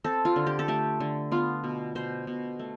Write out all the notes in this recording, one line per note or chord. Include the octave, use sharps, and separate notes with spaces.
C4 A4
F4
D3
G4
A4
A3 G4
D3
B3 F4
B2
B2 C5
B2
A3